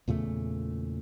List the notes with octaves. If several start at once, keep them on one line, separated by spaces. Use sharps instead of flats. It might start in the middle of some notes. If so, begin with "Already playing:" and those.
E2 A#2 C#3 A3